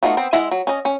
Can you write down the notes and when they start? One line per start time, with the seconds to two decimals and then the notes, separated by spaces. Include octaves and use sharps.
0.03 A3 B3 D#4 F4 F#4
0.17 B3 C4
0.33 G#3 E4 D#5 E5 F#5
0.51 F#3
0.67 C#4 D#5
0.85 C#4